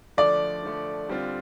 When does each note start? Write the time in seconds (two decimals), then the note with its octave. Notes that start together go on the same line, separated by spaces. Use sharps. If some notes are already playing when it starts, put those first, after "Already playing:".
0.17 D3 F3 A3 D5
0.63 D3 F3 A3
1.08 D3 G3 C4 F4